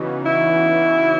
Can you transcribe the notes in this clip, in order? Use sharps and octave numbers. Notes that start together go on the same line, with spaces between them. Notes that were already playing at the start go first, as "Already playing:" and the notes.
Already playing: C#3 E3 B3 D#4 F#4
E4